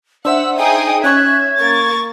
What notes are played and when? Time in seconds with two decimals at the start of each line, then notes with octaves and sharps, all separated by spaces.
0.25 D4 C5 E5 F#5 E6
0.58 D#4 G#4 G5 D#6
1.04 C#4 C#5 E5 F#6 G#6
1.58 A#3 A#4 C#6 A6